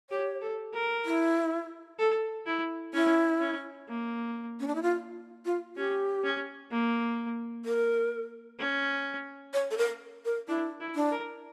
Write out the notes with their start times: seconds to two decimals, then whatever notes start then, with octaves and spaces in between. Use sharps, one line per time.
0.10 G4 C#5
0.42 A4
0.73 A#4
1.05 E4
1.99 A4
2.46 E4
2.94 C#4 E4
3.41 C#4
3.89 A#3
4.60 C#4
4.67 D4
4.75 E4
4.82 F4
5.45 F4
5.76 C#4 G4
6.24 C#4
6.71 A#3
7.65 A#4
8.59 C#4
9.54 C#5
9.71 A4
9.78 A#4
10.25 A#4
10.48 D4 E4
10.80 E4
10.95 D4
11.12 A#4